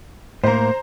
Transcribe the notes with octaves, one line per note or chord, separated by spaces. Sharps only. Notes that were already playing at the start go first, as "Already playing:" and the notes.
A2 A#3 C5 A#5